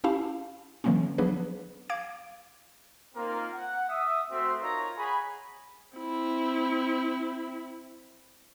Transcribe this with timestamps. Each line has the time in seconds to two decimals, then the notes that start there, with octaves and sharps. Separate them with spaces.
0.04 C#4 E4 G4 F5 A5
0.84 D3 E3 F#3 A#3 C4 C#4
1.18 F3 F#3 B3 D4 G#4 B4
1.89 F5 D6 G#6 D7
3.15 A#3 C4 D#4 F4 A#4
3.53 F#5
3.89 E5 D#6
4.30 A3 C4 F#4 C5 E5 C6
4.61 D#4 F4 A#4 C#5 A#5
4.96 G#4 C#5 F#5 G#5 B5
5.96 C4 E4